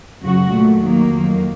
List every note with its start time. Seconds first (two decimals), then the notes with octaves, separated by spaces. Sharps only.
0.23 F#2 C#3 F#3 F#4
0.53 A#2 F#3 A3
0.82 D#2 D#3 F#3 A#3
1.11 F2 D#3 F#3